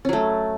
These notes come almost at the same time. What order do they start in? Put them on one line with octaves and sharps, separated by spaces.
C#4 F#3 A3